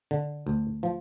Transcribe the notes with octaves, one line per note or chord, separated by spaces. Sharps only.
D3
D2
F3